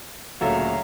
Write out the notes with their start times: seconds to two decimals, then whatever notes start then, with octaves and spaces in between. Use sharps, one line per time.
0.41 D2 A#2 C#3 F#3 A4 E5 F5 A#5